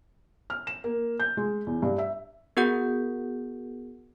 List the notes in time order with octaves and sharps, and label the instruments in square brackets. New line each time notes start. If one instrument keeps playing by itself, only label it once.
[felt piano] F6
E7
A#3
G6
G#3
E2
G2
E5
[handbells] B3 F#4 G#4 A#4 F#5 G6